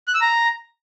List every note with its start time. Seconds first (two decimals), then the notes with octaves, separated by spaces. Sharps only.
0.08 F#6
0.14 E6
0.21 A#5